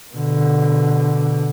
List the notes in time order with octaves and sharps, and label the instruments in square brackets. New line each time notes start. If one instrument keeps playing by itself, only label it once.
[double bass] B2 D3